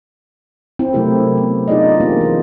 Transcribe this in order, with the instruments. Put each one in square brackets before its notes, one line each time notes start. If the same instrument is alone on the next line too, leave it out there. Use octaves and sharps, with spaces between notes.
[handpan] C4 E4 C5
C3 F#3 A3 E4 G4 A#4
B3
D4 D#4 F4 G#4 D5 D#5
E3 A#3 C4 G4
E3 C5